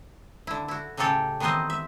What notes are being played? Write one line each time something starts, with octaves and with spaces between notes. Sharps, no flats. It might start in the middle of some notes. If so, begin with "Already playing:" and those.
D3 E4
E4 F#4
A2 C#3 F#3 G4 A4 C#5
D#3 E3 B3 C4 C5 D#5
E5